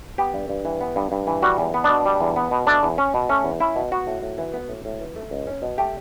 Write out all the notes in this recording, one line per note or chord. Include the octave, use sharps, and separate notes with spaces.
B3 G4
G2
G2
E3
B3
G2
G2
E3
G3 F#4
E2
B3
B2 D4
G3
E2
B3
B2
A3 D4
E2
C#4
B2
A3 C#4
E2
C#4 E4
B2
B3 F#4
A2
A2
E3
B3
A2
A2
E3
A3
C#2
C#4
B2
A3 G4